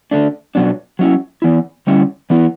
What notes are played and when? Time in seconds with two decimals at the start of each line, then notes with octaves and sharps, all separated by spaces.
0.11 D3 A3 D4
0.55 B2 F#3 B3 D4
0.99 F#3 C#4 E4
1.42 E3 B3 E4
1.87 D3 G3 C#4 E4
2.30 E3 B3 E4